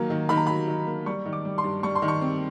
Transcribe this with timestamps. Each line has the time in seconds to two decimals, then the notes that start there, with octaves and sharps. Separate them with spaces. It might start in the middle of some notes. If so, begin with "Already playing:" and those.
Already playing: D#3 F#3 A#3 A#5
0.10 D#3
0.29 D#3 B5
0.37 A#5
0.47 F#3 B5
0.68 D#3
0.87 A#3
1.06 G3 C#6
1.26 D#3
1.33 D6
1.45 G3
1.58 C6
1.64 G2
1.83 G3 C#6
1.95 C6
2.02 D#3
2.08 C#6
2.21 C4